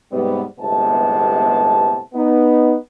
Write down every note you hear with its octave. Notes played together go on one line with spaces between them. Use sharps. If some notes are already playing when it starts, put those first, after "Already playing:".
G#2 C3 G3 B3
G1 A2 C3 G#3 B3 A5
B3 D#4